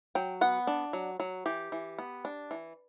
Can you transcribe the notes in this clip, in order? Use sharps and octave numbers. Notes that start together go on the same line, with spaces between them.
F#3 G5
B3 F#5
D4
F#3
F#3
E3 G4
E3
B3
D4
E3